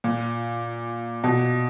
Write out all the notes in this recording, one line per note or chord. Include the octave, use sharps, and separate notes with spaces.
A#2
B2